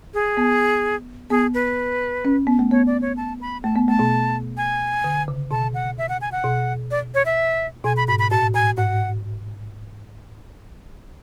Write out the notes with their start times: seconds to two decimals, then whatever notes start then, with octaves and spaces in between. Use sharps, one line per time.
0.14 G#4
0.37 B3
1.30 B3 G#4
1.54 B4
2.25 C#4
2.47 B3
2.59 A3
2.71 B3 C#5
2.87 D5
3.02 C#5
3.17 A5
3.41 B5
3.64 A3 A5
3.76 B3
3.88 A3 A5
3.99 B2
4.57 G#5
5.04 D3
5.28 C#3
5.51 B2 A5
5.74 F#5
5.98 E5
6.09 F#5
6.21 G#5
6.32 F#5
6.44 B2
6.91 D5
7.14 C#5
7.26 E5
7.84 B2 G#5
7.97 B5
8.08 G#2 B5
8.19 B5
8.31 A2 A5
8.54 A2 G#5
8.77 G#2 F#5